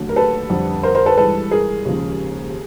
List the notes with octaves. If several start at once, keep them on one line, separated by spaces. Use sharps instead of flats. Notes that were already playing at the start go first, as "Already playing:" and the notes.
Already playing: D#2 D3 F#3 A3
A#4
A4 B4
F2 D3 G3
A#4 C5
A#4 C5
A4 B4
G2 E3 G#3 A4 B4
G#4 A#4
D#2 C#3 F3 G#3